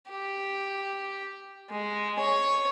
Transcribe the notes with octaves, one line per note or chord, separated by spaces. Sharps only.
G4
G#3
C#5